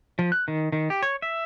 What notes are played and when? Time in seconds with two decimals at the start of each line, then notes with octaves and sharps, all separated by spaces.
0.19 F3
0.32 F#6
0.48 D#3
0.72 D#3
0.90 G4
1.03 C#5
1.22 E5